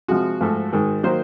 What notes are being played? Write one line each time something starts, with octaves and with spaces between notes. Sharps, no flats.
C3 F3 G#3 F#4
G#2 F3 A3
G#2 D#3 G#3
D#3 F#3 A#3 C5